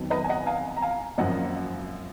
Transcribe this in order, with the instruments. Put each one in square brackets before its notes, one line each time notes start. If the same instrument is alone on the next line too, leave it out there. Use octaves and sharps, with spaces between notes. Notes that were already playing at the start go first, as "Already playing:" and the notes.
Already playing: [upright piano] F2 D#3 F#3 B3
B4 D#5
G#5
D#5 F#5
F5 G#5
A#5
F5 G#5
G#1 F#2 F3 A#3 D#5 F#5